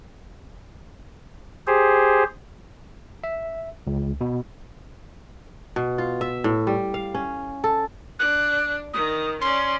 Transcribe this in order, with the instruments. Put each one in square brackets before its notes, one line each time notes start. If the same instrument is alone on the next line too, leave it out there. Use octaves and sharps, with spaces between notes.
[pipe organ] G4 G#4 C5
[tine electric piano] E5
C#2
B2
[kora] B2
F4
E5
A2
G3
F5
C#4
A4
[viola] D4 [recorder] F#6
[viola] D#3 [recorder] D#6
[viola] C#4 D5 [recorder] C6